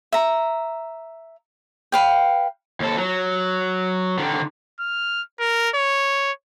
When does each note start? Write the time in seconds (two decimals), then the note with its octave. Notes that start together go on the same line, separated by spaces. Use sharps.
0.12 E5 A#5
1.92 B4 F5 G5
2.80 D#2 A4
2.98 F#3
4.19 D3 D#3
4.80 F6
5.40 A#4
5.75 C#5